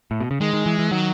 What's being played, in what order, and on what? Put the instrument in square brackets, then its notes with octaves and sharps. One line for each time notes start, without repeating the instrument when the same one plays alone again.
[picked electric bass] A2
B2
C#3
[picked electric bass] D#3 [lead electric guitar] G#3
[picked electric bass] D#3
E3
E3
[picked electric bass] D#3 [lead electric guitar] F#3